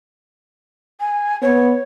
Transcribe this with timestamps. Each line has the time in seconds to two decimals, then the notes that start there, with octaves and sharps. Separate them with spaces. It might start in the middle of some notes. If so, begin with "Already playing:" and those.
1.00 G#5
1.42 B3 C#5